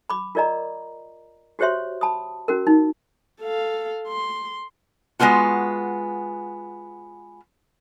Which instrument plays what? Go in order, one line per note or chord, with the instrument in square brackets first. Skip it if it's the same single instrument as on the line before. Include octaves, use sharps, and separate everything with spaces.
[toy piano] B5 D6
F4 A#4 D5 D#5 A#5
F#4 G4 C5 C#5 E5 C6
A5 B5 D#6
C#4 F#4 A#4
D#4
[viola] A4 F5
C6
[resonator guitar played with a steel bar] G#3 A#3 B3 F4 F#4